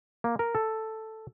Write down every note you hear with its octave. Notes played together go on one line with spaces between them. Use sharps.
A#3
A#4
A4